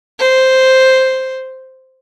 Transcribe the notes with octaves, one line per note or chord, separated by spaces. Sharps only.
C5